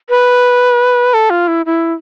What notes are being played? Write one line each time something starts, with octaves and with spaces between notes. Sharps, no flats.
B4
A4
F4
E4
E4